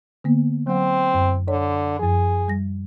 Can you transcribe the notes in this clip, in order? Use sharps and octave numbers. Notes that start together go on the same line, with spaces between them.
D3 A#3 B3
F#3 C4 F#5
F#2
D3 C#5
F#2 F3 G#4
G3 A#6